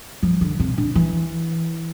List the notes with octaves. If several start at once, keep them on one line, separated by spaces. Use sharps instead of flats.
F3
D3
C3
D3
E3